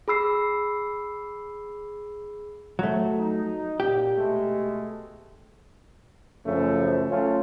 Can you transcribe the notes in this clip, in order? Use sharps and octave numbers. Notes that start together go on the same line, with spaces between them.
G#4 B5 E6 C7
F#3 A3
D#4
A#2 G4
B2 G#3 A3
F#2 C#3 F3 A3
F#3 A3 C#4 F4